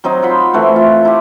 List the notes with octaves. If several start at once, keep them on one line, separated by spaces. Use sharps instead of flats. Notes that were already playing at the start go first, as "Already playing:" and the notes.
F#3 C4 D#4
F4 F#5 B5 C6
E3 A3 C4 F#4
F4
E4 G4